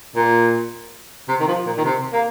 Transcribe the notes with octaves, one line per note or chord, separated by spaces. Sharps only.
A#2
C3
D#3
F3
A#2
D#3
C3
A#3